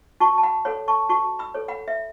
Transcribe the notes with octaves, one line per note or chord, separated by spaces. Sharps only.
F#4 A5 C#6
A5
F#5 B5
A4 C#5 F#5 B5
A5 C#6
F#4 A5 C#6
B5 E6
A4 C#5
F#5 B5
E5